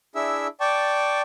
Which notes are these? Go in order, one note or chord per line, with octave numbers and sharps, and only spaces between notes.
D4 E4 G#4 E5 E6
D5 G5 A5 C#6 D6